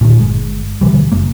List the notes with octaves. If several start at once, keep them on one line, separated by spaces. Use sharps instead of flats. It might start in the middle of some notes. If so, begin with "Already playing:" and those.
A#2 D3 D#3
G1 G#3
B2 D3 E3 G3
F#1 G#3 A#3